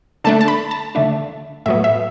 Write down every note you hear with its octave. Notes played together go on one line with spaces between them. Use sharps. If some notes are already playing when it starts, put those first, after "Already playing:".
D3 A3 D4 A5
A5
B5
A5
D3 A3 D4 E5
A2 F#3 B3 E5
E5